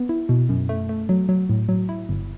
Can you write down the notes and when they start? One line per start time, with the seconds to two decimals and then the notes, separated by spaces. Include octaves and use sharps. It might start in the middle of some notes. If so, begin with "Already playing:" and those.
Already playing: B3
0.09 E4
0.29 B2
0.49 F#2
0.69 A3
0.89 A3
1.09 F#3
1.29 F#3
1.49 A2
1.69 F#3
1.89 E4
2.09 G1